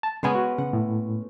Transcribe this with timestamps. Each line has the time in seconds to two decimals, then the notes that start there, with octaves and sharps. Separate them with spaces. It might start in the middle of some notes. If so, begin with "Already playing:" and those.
0.03 A5
0.23 C#3 G#3 B3 C#4 G#5
0.35 F#4
0.58 C#3 F#5
0.73 A2